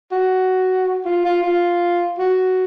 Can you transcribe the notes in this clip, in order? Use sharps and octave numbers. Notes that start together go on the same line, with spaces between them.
F#4
F4
F4
F4
F#4